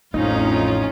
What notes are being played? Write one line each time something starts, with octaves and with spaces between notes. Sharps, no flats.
A1 F2 A2 C#4 D#4 F4